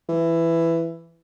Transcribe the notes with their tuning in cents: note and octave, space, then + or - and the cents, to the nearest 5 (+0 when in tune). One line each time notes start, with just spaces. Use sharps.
E3 +10